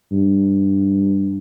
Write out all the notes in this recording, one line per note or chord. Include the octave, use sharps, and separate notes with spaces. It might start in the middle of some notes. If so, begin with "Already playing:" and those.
G2